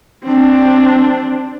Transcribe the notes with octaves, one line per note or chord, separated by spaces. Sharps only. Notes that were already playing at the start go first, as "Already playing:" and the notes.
C4 D4